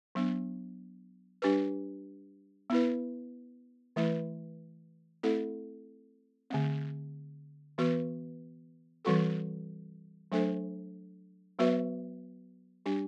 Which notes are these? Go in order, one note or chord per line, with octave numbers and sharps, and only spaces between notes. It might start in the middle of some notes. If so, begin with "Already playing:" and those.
F#3 B3 D4
G3 D4 G4 B4
B3 E4 B4
E3 A3 E4 B4
A3 C4 E4 A4
D3 A3 C4
E3 B3 F#4 B4
E3 G3 C4 F#4 A4
F#3 A3 D4 A4 C5
F#3 B3 F#4 B4 E5
G3 D4 G4